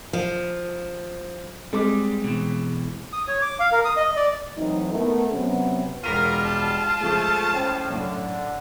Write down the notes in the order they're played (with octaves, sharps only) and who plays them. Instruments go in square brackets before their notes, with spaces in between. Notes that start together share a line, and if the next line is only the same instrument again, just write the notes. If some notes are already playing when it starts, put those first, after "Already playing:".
[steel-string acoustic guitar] F3
[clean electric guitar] G3 [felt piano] G#3 C4 D6
[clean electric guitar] B2 E3
[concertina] D#6
C#5
D6
F5
A#4
D#6
D#5
D5
[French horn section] E3 F#3 A3 C4 D#4
A3 B3 A#4
C3 F#3 B3 C#4
[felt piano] E1 B6 D#7 [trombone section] B2 G3 [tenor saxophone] F4 [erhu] A#4
[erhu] A5
[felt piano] F3 G#3 [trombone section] A3
[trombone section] A2 [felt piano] C#4 C5 G5
[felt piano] F#2 A2 [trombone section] D3